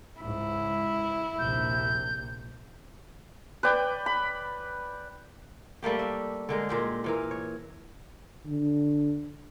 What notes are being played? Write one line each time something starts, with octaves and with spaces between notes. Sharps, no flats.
C#2 G#2 E4
A#1 D#2 C3 G6
B4 D5 G5
B5
G3 A3 A#3 G4
E5
D3 G#3 A#4
A#2 G#3 G4
A#2 E3 A#4
C#5
D3